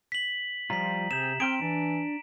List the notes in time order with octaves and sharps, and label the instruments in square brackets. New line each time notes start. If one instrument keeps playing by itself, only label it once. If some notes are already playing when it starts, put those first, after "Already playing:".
[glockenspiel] B6 F#7
[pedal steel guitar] F3 G3 F4 [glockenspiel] A#5 B6
[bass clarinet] C3 [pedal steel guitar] C4 G#4 G6 [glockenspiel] E7
[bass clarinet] C4 [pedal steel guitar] G#4 G5 F6 [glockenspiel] D7
[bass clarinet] E3 [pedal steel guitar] D4